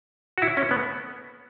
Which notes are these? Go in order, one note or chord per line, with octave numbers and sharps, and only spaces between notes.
F#4
E4
C#4
B3